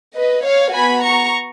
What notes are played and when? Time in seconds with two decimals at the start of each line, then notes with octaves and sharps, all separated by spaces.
0.17 B4 D#5
0.45 C#5 F5
0.73 B3 F#4 G#5 B5
1.02 A#5 C#6